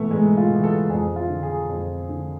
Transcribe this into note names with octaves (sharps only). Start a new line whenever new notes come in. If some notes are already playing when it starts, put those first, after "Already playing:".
Already playing: G#2 E3 A3 B3
G#2 G#3
F4
E3
A4
F2 G#4
F4
D3
G#4
F2
D3